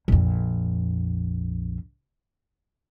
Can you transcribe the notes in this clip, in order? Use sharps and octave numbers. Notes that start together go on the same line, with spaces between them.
A#1 F2